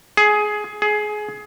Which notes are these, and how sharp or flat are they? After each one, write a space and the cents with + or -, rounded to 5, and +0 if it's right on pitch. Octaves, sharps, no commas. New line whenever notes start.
G#4 +15
G#4 +20